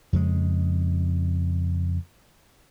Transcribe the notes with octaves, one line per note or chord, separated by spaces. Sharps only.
F2 C#3 G#3